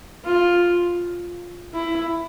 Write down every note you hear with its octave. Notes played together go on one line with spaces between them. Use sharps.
F4
E4